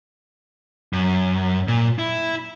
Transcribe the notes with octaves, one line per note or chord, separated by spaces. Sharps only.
F#2
A#2
E4